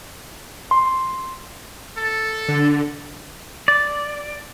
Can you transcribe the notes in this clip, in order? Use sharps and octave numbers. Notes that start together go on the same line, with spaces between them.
C6
A4
D3
D5